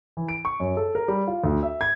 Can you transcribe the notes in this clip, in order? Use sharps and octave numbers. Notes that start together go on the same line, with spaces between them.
E3
D7
C#6
F#2
A4
A#4
G3
F4
D2
E5
G#6